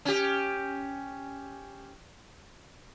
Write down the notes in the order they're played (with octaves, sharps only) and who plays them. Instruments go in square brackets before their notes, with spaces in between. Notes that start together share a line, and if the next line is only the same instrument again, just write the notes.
[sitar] C#4 G4